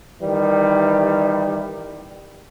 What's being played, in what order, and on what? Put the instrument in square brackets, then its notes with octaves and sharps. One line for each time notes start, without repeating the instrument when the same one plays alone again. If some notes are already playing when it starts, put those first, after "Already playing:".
[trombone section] D#3 E3 G3